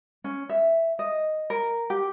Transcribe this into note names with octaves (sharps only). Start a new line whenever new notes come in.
C#4
E5
D#5
A#4
G4